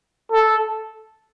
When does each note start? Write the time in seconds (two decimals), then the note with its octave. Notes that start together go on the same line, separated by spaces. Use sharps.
0.32 A4